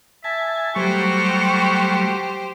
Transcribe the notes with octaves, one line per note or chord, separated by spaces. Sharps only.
E5 G#5 A5
F#3 G3 A3 F#4 G4 C5 C#6